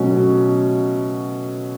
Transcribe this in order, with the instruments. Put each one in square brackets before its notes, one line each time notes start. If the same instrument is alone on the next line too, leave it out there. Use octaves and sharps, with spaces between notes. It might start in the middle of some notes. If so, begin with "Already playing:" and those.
Already playing: [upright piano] B2 F#3 A3 C#4